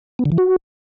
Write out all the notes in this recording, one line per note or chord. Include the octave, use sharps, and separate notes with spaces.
B3
D3
E3
F#4